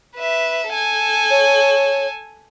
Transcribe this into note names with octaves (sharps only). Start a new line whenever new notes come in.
B4 E5
A4 G#5
C#5